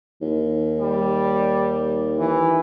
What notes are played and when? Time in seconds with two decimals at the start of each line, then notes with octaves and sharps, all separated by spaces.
0.21 D#2
0.80 G3
2.19 E3